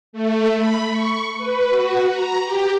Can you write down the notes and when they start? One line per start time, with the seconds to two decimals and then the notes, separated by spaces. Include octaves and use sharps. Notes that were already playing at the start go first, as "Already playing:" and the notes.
0.13 A3
0.57 B5
0.89 C#6
1.38 B4
1.70 F#4
2.13 A#5
2.44 G4